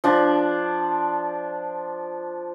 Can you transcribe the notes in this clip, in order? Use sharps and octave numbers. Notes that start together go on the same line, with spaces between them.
F3 D4